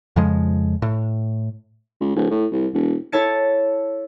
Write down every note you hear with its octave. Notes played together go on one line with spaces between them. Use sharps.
F2 C#3 F3 G#3
A2
C#2
D1
A2
C2
E1
E4 A4 C#5 A5 A6 C#7